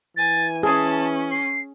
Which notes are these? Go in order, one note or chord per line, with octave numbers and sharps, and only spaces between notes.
E3 G#5 A6
C#4 G#4 A5
C7